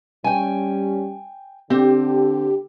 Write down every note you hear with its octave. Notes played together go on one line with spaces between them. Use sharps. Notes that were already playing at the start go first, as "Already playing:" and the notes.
G3 C#4 G5 G#5
D3 C4 G4